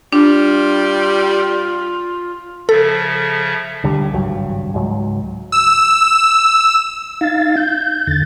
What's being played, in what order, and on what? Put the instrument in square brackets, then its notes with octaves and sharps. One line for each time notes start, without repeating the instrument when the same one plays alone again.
[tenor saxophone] G3 [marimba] D4 [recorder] F4
[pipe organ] C#3 F3 E5 [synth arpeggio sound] A4
[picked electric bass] C#2 D3 G3
G#1 C#2 G2 F#3
C#2 G#2 F#3
[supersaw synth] E6
[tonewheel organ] D#4 F5 A6
G6
E2 D3 A6